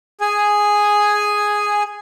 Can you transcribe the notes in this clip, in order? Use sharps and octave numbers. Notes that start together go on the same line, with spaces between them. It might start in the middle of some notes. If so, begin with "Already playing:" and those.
G#4 G#5